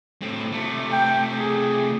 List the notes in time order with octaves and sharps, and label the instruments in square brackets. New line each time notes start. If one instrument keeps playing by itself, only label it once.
[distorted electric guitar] A2 C4
C3 A3
[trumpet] G5
G#4